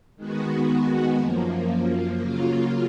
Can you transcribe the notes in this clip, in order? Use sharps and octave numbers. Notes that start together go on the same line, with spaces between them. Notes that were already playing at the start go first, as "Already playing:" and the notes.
D#3 G#3 B3 F#4
F#2 F3 A#3
C#3 F#3 A#3 F4